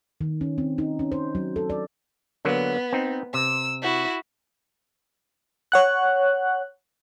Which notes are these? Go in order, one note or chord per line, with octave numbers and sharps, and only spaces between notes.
D#3
C#4
C4
D#4
C#4
C5
F#3
A4
D5
D3 F#3 A#3 B3
C4 D#4
C3 E6
E4 F#4
C#5 F#5 F#6